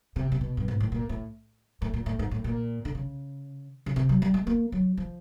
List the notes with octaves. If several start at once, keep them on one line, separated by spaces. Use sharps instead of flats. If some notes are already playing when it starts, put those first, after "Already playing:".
C3
C3
B2
G2
G#2
A2
A#2
A2
A2
A#2
A2
G#2
A2
A#2
D3
C#3
C#3
C3
F#3
G3
G#3
A#3
F#3
F3